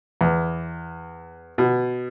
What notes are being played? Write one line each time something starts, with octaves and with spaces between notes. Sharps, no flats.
E2
B2